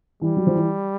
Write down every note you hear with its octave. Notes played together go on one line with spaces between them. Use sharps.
E3 G3
F#3
F3
E3